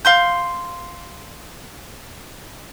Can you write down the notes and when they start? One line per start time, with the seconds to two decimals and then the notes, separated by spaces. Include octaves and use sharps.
0.05 F5 C6 G6